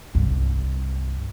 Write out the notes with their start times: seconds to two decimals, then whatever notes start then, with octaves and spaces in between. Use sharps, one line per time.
0.15 C2 G2